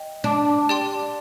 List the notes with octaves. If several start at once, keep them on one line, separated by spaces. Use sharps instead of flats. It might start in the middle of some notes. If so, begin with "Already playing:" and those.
Already playing: D#5 G5
D4
G4 D5 G5 C6